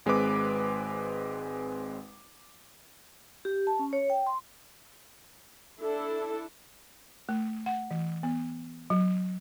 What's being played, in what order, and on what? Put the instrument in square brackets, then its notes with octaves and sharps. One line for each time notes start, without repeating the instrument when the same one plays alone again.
[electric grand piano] G#1 G#3 C4 B4 D6
[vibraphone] G4
A5
C#4
C#5
G5
C6
[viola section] D4 E4 A4
[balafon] A3
F#5
E3
B3
F#3